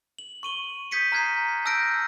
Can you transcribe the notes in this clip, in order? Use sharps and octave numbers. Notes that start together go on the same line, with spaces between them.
F#7
C#6 D#7 G7
D#6 G6 G#6 B6 C#7 D#7
A#5 F6 F#6 G#6 A#6 C7
A5 E6 F6 G6 A#6 D7